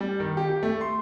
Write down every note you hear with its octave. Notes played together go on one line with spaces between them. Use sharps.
G3
D#3
G4
G4
A3
C6